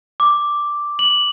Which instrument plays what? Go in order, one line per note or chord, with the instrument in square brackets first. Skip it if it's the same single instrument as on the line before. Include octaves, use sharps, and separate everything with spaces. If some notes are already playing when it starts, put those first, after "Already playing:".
[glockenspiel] D6
F#7